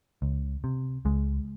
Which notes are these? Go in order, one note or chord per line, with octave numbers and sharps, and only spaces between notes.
C#2
C3
C#2 G#3